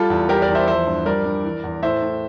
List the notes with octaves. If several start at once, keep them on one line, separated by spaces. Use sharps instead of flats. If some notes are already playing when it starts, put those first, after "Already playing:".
Already playing: G3 F4 A4
E2
G3 G4 A#4
A#4 D5
E2
C5 E5
F3 C5 E5
G2
G3 A#4 D5
G2
E3
E2
A2 C5 E5
A2